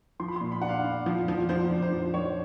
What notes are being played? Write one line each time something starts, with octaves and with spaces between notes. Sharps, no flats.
F3 C6
B5
A#2 C6
B5
D4 F#5
F5
D4
F3
F3
F3 C5
D4
C5
F3
F3 C#5